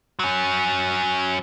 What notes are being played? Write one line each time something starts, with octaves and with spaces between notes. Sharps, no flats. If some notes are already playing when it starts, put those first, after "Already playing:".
F#3 C#4